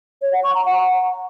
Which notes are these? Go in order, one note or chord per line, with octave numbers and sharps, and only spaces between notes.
C#5
F#5
C#6
A#5
F#5